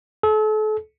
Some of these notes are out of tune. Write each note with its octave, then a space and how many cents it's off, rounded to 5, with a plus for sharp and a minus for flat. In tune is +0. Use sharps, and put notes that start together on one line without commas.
A4 -40